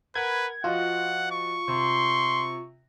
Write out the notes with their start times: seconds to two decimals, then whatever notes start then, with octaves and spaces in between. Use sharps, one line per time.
0.15 A#4 B4 F#5 B5 G#6
0.64 F3 F4 F#4 D#5 F#5
1.32 C#6
1.68 C3 C6